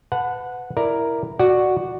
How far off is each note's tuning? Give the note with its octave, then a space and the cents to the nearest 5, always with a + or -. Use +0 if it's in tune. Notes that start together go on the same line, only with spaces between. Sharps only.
B4 +25 F#5 -15 A5 +10
E4 +0 A#4 +0 D5 +0
F#4 +0 D5 +10 F#5 +0